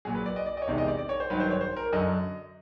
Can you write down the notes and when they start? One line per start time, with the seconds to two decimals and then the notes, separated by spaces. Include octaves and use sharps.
0.05 A#2 F#3 G#4
0.15 B4
0.26 D5
0.36 D#5
0.46 D5
0.57 D#5
0.62 C#5
0.67 E2 C3 D#3 G#3 D5
0.78 D#5
0.88 D5
0.99 D5
1.09 C#5
1.20 C5
1.30 G2 D#3 F#3 B4
1.40 C5
1.51 C#5
1.61 C5
1.77 A#4
1.93 F#2 D3 F#3 D#5